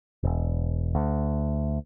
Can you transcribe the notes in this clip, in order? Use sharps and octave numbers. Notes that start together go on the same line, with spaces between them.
E1
D2